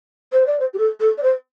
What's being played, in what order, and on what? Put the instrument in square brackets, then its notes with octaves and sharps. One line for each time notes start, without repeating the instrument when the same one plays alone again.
[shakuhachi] C5
D5
C5
G4
A4
A4
D5
C5